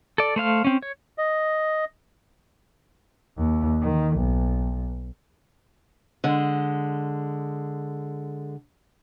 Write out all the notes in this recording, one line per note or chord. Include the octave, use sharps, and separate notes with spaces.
A4 D5
A3 C5 F5 F6
C4 C#4
C#5
D#5
D#2
D#3
B1
D3 G#3